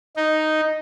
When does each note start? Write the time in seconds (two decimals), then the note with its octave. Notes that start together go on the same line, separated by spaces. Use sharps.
0.16 D#4